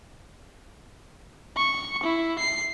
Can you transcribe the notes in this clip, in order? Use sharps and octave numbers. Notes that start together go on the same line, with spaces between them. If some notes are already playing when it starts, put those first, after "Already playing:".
C#6
E4
C7